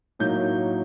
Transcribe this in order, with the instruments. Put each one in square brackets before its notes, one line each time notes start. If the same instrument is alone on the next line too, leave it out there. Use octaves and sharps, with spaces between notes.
[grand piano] A2 F#3 A#3 D#4 G6